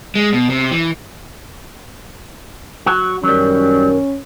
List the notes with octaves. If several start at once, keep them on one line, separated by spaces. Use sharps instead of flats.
G#3
B2
C3
E3
F#3 F#4
F#2 D#3 F#3 G3 C#4